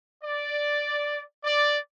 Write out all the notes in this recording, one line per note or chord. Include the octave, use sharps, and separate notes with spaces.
D5
D5